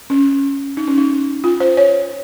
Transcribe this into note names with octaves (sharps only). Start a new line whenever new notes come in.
C#4
D#4
C#4
D#4
F4
C5
C#5